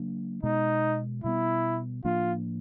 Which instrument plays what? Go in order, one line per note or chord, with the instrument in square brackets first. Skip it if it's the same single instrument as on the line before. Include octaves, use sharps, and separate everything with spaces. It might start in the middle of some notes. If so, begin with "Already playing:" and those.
Already playing: [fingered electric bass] C#3 F#3 A#3 D4
[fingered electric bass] B2 G#3 B3 [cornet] D#4
[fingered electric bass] B2 G3 B3 [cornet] E4
[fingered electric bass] A2 F3 A#3 D4 [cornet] F4